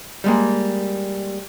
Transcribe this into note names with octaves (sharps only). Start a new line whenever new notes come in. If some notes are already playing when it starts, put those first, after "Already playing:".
G3 G#3 A#3